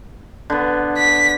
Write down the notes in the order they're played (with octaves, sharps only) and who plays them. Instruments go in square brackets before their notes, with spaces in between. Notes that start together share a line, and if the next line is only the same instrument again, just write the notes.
[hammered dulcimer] D3 B3
[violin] B6